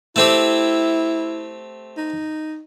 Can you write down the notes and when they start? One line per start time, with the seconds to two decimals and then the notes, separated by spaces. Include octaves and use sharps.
0.16 A3 C4 E4 G4
1.98 D#4